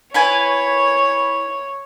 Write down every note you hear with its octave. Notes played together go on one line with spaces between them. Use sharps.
E4 B4 C#5 G#5